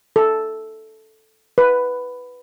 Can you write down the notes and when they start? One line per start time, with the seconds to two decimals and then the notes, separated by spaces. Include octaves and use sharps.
0.16 A4
1.58 B4